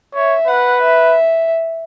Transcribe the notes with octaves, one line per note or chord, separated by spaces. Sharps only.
C#5 E5
B4 F#5
E5